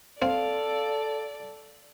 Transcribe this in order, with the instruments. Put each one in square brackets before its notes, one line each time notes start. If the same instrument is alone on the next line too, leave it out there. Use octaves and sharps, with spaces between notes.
[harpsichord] C4 [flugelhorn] A4 [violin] D5 [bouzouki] F5